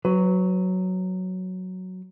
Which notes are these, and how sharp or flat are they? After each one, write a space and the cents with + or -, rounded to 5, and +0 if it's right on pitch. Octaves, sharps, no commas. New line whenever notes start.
F#3 +0 B4 +25